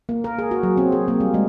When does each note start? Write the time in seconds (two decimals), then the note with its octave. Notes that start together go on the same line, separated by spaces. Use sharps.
0.09 A#3
0.24 A#4
0.39 G#4
0.51 F#4
0.63 F#3
0.77 C4
0.92 G#4
1.08 A#3
1.20 G3
1.34 G#3